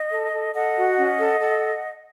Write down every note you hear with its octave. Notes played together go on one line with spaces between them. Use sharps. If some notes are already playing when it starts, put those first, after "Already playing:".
Already playing: D#5
A4
A4
A4 D#5 F#5
F#4
C#4
A4
A4